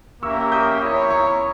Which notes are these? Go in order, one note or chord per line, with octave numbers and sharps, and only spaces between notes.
A#3 C#4 G4 A#4 E5 C#6 E6
D#6 G6
E4 A#4 C#5 B5 D#6
A#5 C#6